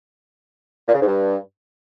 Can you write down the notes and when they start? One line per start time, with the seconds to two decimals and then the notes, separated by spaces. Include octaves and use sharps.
0.88 A#2
0.94 C#3
1.01 G#2
1.07 G2